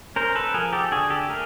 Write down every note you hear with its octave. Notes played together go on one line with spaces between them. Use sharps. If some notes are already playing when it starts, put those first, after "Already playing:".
C#4 A#4 C5
A4 B4
F3 G#4 A#4
G4 A4
D3 F#4 G#4
G4 A4
A3 G#4 A#4